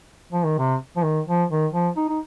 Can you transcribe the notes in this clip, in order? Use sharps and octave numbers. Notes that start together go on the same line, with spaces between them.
F3
D#3
C3
F3
D#3
F3
D#3
F3
D#4
D#4